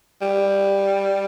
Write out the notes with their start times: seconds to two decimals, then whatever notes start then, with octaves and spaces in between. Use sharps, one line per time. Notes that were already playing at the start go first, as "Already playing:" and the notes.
0.22 G3